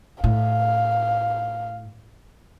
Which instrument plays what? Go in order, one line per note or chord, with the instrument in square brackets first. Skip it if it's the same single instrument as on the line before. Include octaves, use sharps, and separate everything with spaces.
[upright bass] A2 [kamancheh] F5